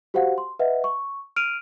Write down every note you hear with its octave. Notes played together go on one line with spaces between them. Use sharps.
F#4 G4 C5 F5 F#5
C6
B4 D#5 E5 F#5
C#6
F6 D7 D#7 F7